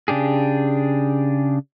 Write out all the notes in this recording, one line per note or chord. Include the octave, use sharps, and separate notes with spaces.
C#3 D4 G4 G#4